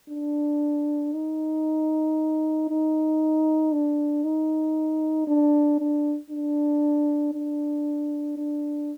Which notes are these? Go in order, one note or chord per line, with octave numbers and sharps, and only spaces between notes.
D4
D#4
D#4
D4
D#4
D4
D4
D4
D4
D4